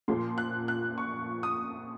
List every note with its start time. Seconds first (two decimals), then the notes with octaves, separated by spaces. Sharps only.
0.08 A#2 F3 C6
0.38 F#6
0.68 F#6
0.98 C#6
1.43 D#6